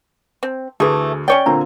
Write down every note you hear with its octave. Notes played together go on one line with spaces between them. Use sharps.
C4
D2 E3 A3 G#4
C#4 C#5 D5 G5
A#2 D3 C4 A#5